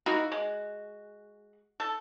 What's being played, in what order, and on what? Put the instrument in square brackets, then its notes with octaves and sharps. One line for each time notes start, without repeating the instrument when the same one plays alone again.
[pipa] A#3 D#4 E4 [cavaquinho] F#4
[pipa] G#3
A4